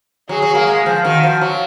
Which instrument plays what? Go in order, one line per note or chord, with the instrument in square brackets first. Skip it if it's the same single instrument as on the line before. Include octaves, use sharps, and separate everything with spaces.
[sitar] F#3 [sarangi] G#4
[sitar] F#3
A#3
G#3
F3
[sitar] D#3 [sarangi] F#4
[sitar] F3
F#3